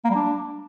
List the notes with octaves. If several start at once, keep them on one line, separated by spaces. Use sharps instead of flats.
A#3
G3
D4